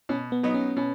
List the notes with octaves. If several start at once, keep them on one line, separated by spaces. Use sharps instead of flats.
B2 C#4
B3
F#3 B3 D#4
C#4
B2 C#4